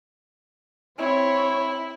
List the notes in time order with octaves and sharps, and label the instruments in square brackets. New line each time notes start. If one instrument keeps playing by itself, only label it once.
[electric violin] C4 C#5 [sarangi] E4